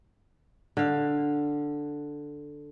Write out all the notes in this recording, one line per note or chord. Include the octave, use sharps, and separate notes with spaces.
D3 F5